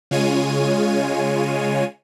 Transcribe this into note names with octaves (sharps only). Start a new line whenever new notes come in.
C#3 G#3 F4 C#5 G#5 D#7